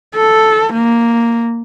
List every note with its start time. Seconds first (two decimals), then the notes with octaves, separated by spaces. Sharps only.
0.15 A4
0.73 A#3